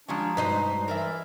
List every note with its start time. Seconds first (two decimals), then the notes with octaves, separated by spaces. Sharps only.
0.08 F3 G3 G#3 C#4 D4 A#5
0.37 G2 B2 D#4 B4 C5
0.88 E3 A#4 D5 E5